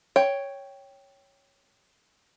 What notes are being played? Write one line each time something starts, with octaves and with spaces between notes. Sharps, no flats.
C#5 G5